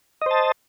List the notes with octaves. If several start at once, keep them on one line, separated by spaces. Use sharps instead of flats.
C5 D#5 A5